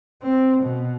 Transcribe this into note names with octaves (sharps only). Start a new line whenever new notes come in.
C4
B2